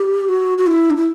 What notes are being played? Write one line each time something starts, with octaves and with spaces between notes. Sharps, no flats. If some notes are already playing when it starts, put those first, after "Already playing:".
Already playing: G4
F#4
F#4
E4
D4
E4